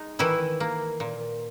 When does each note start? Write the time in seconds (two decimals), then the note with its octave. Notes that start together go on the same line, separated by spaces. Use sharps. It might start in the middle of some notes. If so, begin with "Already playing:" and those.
Already playing: G#3 D#4
0.19 D#3 E3 E4
0.60 A#3
1.00 A#2